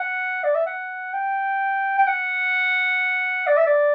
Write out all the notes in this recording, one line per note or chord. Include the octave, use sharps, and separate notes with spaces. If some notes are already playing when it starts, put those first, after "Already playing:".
Already playing: F#5
D5
E5
F#5
G5
G5
F#5
D5
E5
D5